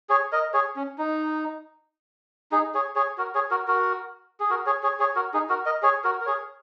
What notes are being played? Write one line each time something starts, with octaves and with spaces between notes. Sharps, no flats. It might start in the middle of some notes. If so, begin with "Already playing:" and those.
G#4 C#5
A#4 D#5
G#4 C#5
C#4
D#4
D#4 G#4
G#4 C#5
G#4 C#5
F#4 A#4
G#4 C#5
F#4 A#4
F#4 A#4
G#4
F#4 A#4
G#4 C#5
G#4 C#5
G#4 C#5
F#4 A#4
D#4 G#4
F#4 A#4
A#4 D#5
G#4 C#5
F#4 A#4
A#4
G#4 C#5